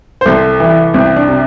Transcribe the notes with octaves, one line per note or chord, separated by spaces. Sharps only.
C5
C2 A4
E3
C2 C4
D4
C3